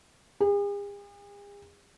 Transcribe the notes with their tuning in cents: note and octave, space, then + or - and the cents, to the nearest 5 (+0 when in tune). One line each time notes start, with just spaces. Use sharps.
G#4 -45